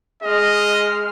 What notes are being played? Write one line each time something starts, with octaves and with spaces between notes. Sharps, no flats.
G#3 D#5 F6